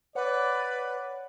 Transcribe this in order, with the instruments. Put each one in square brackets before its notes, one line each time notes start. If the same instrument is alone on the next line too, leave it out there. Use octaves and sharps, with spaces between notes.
[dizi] B4 [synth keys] C#5 F#5 [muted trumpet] D5